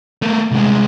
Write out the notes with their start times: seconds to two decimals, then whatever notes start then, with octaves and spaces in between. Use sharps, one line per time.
0.22 A3 A#3
0.51 C2 G#3